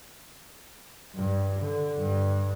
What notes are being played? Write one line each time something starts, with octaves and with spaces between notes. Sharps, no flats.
G2
D3
G2